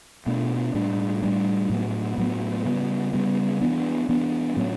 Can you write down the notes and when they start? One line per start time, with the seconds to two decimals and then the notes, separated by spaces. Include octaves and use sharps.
0.27 B2 A3 D4
0.75 A2 G3 D4
1.22 A2 G3 D4
1.70 A2 F#3 B3
2.18 A2 F#3 B3
2.65 C#3 G3 B3
3.13 C#3 G3 B3
3.61 E3 B3 D4
4.09 E3 B3 D4
4.57 A2 F#3 C#4